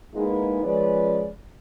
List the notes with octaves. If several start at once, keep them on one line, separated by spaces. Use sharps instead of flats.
G#3 A#3 B3 D#4 E4 G#4
F3 G#3 C#4 B4 D5